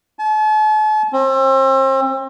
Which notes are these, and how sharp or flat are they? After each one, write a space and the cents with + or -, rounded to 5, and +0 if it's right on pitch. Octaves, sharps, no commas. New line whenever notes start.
A5 -45
C4 +35